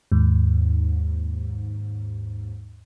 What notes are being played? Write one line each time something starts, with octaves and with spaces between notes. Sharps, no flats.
D#2 G#2